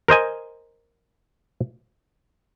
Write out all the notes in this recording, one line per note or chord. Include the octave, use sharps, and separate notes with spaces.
A#4 C5 D#5 G#5